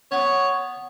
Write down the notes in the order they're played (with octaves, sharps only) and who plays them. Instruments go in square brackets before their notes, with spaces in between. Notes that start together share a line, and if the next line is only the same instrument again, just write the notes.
[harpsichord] B3 [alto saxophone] C#5